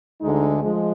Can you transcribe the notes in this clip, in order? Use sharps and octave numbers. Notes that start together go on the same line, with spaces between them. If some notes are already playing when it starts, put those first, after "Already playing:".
D2 D3 G#3 D#4
F3 G#3